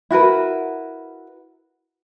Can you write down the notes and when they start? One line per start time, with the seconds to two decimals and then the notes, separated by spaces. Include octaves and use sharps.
0.11 E4 F#4 A#4 B4